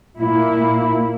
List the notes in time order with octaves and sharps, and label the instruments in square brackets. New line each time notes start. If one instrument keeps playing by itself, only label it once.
[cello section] A#2 A#3 E4